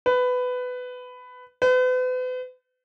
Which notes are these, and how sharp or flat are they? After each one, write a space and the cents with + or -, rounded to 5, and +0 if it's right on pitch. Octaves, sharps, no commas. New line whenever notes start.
B4 +15
B4 +40